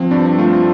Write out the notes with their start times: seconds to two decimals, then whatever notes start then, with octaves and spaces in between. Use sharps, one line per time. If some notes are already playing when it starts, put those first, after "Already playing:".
Already playing: F3 C4
0.11 G2 D4
0.38 A3 F4